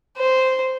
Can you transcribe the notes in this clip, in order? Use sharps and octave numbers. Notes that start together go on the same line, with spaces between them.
C5